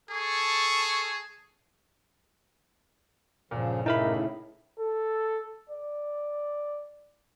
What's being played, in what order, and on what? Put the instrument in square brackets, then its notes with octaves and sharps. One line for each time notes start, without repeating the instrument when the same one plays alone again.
[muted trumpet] G#4 [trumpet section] A4 A5 C#6
[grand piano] G1 A#2 [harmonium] C#3 F3
[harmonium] A2 C#3 [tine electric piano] D#4 A#4 B5 [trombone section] E4
[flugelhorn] A4
D5